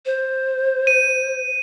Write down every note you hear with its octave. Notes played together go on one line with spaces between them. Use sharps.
C5
D#7